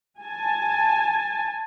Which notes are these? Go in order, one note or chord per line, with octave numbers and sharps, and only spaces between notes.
G#5 A5